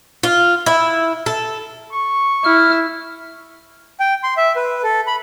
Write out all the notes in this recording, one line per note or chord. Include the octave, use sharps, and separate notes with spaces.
F4
E4
A4
C#6
E4 F6
G5
C6
E5
B4
A4
B5